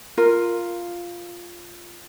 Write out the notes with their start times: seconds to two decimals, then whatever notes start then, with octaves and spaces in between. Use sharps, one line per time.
0.18 F4 A#4